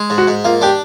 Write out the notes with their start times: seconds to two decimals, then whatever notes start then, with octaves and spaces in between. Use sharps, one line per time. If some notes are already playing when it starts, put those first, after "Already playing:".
Already playing: G#3
0.10 G#2
0.18 F#4
0.28 G#2
0.44 A#3 F4
0.61 D4 G4